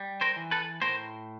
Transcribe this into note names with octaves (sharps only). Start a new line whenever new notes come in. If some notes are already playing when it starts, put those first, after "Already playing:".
Already playing: G3
A#4 C5
E3
A4 B4
A2 A#4 C5